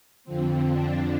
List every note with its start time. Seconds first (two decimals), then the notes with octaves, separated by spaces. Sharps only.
0.24 F2 D3 F3 C4
0.67 D4